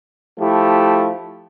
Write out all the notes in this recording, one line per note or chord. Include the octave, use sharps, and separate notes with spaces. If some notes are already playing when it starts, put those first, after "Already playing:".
F3 A3 E4 G4